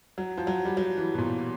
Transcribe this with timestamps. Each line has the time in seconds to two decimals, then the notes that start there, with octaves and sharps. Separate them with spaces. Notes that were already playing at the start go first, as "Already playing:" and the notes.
0.18 F#3
0.37 F3
0.47 F#3
0.65 G3
0.77 F#3
0.97 E3
1.14 B2
1.18 A#2